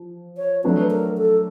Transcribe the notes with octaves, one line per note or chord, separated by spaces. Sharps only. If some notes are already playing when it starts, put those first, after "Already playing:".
Already playing: F3
C#5
F#3 A3 D4 F#4 B4
A#4
A4